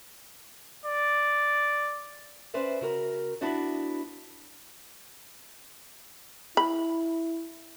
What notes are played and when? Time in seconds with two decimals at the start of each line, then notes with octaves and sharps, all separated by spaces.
0.85 D5
2.54 C#4 B4 C5 D5 E5
2.81 C#3 F#4 A#4
3.41 B3 D4 E4 F#4 D5
6.57 E4 B5